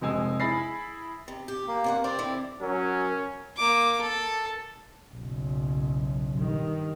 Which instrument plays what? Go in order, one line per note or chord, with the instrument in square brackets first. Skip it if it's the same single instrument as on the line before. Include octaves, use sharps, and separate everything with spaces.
[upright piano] F1 C3 G#3 G#5 E6
E4 G#4 B5 A6 A#6 C7
[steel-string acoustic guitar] C3
G4
[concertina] A#3
[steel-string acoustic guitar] C3 C#5 F#5
[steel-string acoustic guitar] G3 C4 C5 [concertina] D5
[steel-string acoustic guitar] D3 C4 E4
[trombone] F#3 [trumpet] C#4 [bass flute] A#4
[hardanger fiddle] A#3 D6
A4
[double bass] F#1 B1
G2 D#3